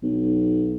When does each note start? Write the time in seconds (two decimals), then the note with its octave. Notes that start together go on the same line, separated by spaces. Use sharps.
0.03 B1